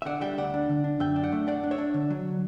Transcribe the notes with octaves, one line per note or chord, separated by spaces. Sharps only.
E5
D3 D5 F#5
G3 E5 G5
D2 D5 F#5
D4
D3
D4
F#2 E5 G5
D4
D5 F#5
A3
D4 D5 F#5
D4
C#5 E5
D4
D3
F#3